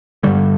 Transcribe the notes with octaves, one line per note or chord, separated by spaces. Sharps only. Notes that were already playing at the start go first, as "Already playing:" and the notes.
G2 D3 G3